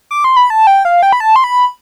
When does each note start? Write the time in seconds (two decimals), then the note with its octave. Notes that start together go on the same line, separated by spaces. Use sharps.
0.11 D6
0.24 C6
0.36 B5
0.50 A5
0.67 G5
0.85 F5
1.03 G5
1.13 B5
1.20 A5
1.36 C6
1.44 B5